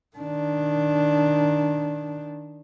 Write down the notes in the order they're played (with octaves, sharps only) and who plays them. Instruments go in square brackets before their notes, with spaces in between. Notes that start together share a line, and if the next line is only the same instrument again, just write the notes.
[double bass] D#3 D4